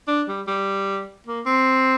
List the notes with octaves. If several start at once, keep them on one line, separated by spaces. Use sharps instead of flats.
D4
G3
G3
A#3
C4